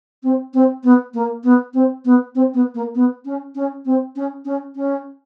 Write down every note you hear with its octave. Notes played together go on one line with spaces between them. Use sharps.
C4
C4
B3
A#3
B3
C4
B3
C4
B3
A#3
B3
C#4
C#4
C4
C#4
C#4
C#4